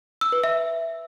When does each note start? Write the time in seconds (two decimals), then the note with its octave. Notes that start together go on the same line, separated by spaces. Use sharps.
0.21 E6
0.32 B4
0.44 E5